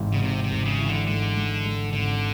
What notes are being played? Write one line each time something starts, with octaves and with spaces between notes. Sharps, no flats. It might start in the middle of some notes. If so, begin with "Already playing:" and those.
Already playing: G#1 G#2 E3
C#3
G#2 C3
C3
G#1
C#3
E3
D3
G#2 D3
G#2
G#2
G#1 D3